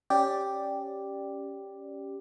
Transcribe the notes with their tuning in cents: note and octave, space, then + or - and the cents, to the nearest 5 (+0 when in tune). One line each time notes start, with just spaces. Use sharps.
C#4 +0 G4 +0 D5 +0